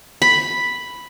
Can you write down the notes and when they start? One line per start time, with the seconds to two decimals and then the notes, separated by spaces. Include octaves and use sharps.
0.22 B5